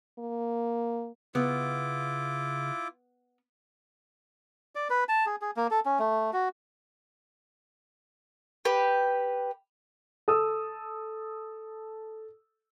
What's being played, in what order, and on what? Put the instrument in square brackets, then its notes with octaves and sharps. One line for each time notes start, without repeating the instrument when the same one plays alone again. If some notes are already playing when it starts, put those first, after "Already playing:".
[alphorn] A#3
[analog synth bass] C#3 [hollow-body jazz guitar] B3 [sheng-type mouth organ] E4 F4 D6
[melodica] D5
B4
A5
G#4
G#4
A#3
A4
C#4
A3
F#4
[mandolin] G4 B4
[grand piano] A4 D#6 E6